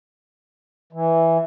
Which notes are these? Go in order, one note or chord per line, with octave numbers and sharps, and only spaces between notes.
E3